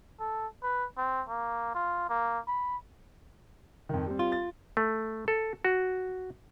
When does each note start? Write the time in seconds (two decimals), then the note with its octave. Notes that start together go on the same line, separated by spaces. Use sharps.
0.20 A4
0.63 B4
0.97 C4
1.28 A#3
1.75 F4
2.09 A#3
2.47 B5
3.89 F2 D#3
4.06 G3 C4
4.19 F4
4.32 A6
4.77 A3
5.28 A4
5.65 F#4